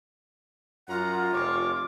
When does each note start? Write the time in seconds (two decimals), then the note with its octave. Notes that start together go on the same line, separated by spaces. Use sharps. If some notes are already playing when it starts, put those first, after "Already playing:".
0.88 F#2 C#4 F4 F#5 A#5
1.32 F1 C#5 D6